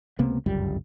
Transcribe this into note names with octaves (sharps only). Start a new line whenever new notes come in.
C#2 C3 A#3 B3
G1 C#2 F#2 G3